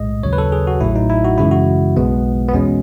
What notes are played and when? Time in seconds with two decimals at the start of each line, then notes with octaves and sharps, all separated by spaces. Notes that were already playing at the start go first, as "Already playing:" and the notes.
Already playing: B1 A2 G#3 D#5
0.23 D#2 C#3 F#3 C#5
0.33 B4
0.38 A4
0.52 G#4
0.67 F#4
0.81 A1 A2 F#3 E4
0.96 D#4
1.10 E4
1.24 F#4
1.38 F#2 C#3 E3 G#3 E4
1.51 F#4
1.97 B1 B2 G#3 B3
2.49 B3
2.53 E2 B2 G#3 C#4